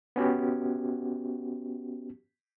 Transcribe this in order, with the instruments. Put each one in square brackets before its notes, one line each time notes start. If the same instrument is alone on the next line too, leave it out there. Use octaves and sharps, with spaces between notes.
[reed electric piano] B3 C#4 F#4 G4